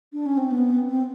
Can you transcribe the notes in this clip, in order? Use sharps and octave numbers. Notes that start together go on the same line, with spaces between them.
D4
C#4
C4
B3
C4